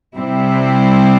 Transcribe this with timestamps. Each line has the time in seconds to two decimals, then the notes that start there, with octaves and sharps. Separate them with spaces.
0.16 C3 G3 C4 E4